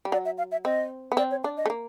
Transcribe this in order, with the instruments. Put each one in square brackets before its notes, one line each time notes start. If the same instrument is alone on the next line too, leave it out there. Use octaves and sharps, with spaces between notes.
[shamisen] G3
[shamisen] F#3 [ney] D5
[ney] E5
F5
E5
[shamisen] C4 [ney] D#5
[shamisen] B3
[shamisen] C4 [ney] D5
[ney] C#5
[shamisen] D4 [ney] D5
[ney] D#5
[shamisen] A3
A#3